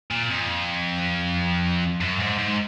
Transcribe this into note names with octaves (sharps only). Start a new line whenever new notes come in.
A#2
F2
F#2
G#2
G#2